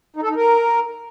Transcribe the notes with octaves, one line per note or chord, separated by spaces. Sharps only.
D#4
A4
D#4
A#4